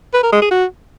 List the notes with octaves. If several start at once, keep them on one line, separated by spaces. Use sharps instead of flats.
B4
A#4
G#3
G#4
F#4